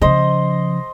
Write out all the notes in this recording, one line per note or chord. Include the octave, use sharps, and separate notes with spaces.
C#3 F3 C5 D#5